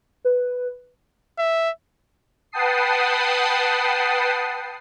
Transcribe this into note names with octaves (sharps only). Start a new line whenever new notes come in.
B4
E5
B4 F#5 G5 A5 D#6 C7